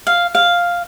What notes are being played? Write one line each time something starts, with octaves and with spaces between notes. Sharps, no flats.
F5
F5